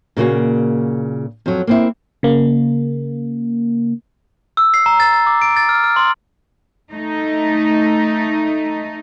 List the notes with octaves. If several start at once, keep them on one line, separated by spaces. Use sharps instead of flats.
A#2 C#3 A#3 F#4
F2 F#3
A#3 C4 E4
C#3 A#3
E6
C7
A#5
A6
A6
D6
D7
A6
F6
F6
C6
A3 D#4